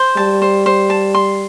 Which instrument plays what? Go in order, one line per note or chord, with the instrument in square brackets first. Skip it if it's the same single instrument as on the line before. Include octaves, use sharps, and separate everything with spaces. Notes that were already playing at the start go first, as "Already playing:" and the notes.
Already playing: [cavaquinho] C5
[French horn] G3 [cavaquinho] A5
[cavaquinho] C5
C5
A5
C6